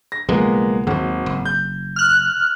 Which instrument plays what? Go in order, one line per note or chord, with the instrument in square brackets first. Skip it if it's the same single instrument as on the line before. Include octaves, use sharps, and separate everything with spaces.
[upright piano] A#6
[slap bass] B1 C#3 F3 [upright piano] G#3 A#3 B3
[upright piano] G#1 [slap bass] D#2 F#3
[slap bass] F#1
[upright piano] G6
[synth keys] F6 F#6